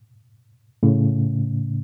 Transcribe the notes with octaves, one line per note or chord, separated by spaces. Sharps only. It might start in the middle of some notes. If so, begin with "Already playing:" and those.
A2 C#3